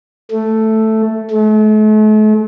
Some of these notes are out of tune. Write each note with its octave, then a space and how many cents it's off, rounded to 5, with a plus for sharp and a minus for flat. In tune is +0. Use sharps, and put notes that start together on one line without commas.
A3 +0
A3 -45